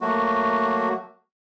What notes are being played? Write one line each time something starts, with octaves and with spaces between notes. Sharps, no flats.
F#3 A3 A#3 F#4